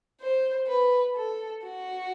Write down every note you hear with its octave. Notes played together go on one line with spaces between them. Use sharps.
C5
B4
A4
F#4